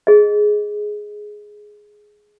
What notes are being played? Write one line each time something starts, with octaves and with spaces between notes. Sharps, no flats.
G#4 D#5